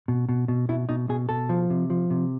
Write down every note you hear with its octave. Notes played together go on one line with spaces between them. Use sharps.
B2
B2
B2
B2 E4
B2 D#4
B2 G#4
B2 A4
F3
C3
F3
C3